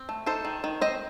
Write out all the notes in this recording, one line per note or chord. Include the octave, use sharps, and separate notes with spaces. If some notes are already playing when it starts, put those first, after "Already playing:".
Already playing: C4
A3
D#4 A4 C5
D#3
D#3
C4 C5 D#5